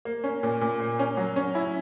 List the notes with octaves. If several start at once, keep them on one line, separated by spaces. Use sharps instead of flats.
A#3
C#4
A#2
A#2
A#3
C#4
F#3
C#4
E4